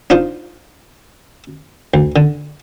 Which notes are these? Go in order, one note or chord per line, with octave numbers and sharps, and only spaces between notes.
D4 D#4 F4 C5
D2
D3